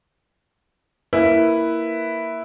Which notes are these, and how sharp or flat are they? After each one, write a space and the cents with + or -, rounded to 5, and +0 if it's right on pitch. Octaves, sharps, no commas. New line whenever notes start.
A#3 +0 E4 +0 B4 +0